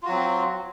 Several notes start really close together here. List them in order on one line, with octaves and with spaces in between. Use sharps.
F4 F#4 F#3 C4